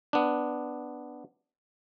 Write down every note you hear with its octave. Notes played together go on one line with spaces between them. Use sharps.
B3 D4